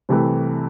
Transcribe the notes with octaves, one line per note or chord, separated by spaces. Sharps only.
C2 C3 E3 A3